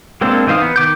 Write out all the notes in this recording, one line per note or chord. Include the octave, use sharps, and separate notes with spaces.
G#3 A#3 C4 D4 A4
E3 D#4 C5 F5 D#6
B3
D#3 D6 G6